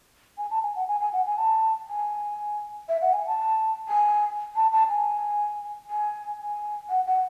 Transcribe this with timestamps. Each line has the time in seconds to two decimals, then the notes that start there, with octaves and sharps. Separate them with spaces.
0.38 G#5
0.50 A5
0.63 G#5
0.75 F#5
0.88 G#5
1.00 G#5
1.13 F#5
1.26 G#5
1.38 A5
1.88 G#5
2.88 E5
3.01 F#5
3.13 G#5
3.26 A5
3.89 G#5
4.55 A5
4.72 A5
4.89 G#5
5.89 G#5
6.39 G#5
6.89 F#5
7.07 F#5